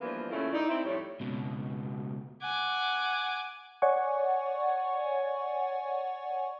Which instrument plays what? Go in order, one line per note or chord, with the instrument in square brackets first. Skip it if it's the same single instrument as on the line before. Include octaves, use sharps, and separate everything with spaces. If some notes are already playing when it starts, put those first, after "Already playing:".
[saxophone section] E3 F3 G3 A#3 B3 D4
A#2 C#3 A3 A#3 C#4 E4
D#4 E4 D5
C4 E4
F2 A2 G3 C#5
[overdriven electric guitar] C#2 B2
[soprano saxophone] F#5 [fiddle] G#5 D6
[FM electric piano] C#5 D5 F#5 G#5 C#6